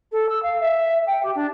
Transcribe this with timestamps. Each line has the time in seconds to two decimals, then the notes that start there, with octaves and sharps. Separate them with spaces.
0.12 A4
0.29 E6
0.43 F5
0.61 E5
1.07 G5
1.23 G4
1.35 D4